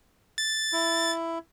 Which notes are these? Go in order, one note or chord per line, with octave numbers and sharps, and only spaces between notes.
A6
E4